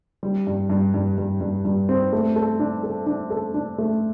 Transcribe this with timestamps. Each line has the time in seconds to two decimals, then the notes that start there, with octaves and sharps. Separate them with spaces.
0.23 G3
0.47 G2
0.70 G2
0.94 G2
1.18 G2
1.41 G2
1.65 G2
1.89 C4
2.13 A3
2.36 A4
2.59 D4
2.83 A4
3.07 D4
3.30 A4
3.54 D4
3.78 A3